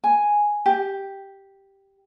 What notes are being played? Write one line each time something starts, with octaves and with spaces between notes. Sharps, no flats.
G#5
G4